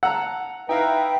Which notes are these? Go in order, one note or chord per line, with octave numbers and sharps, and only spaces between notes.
F#5 A5 A#5 E6
D#4 E4 B4 E5 F5 G5 A#5